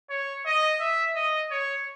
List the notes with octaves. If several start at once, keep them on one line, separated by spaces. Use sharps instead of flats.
C#5
D#5
E5
D#5
C#5